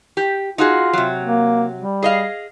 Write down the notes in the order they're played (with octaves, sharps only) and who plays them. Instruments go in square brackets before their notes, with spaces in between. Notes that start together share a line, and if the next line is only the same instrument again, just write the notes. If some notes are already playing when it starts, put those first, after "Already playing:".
[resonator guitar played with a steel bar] G4
[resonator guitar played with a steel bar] D#4 F#4 G#4 [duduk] F4
[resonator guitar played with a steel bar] C3 F#3
[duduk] A#3
G3
[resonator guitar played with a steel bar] G#4 D#5 F5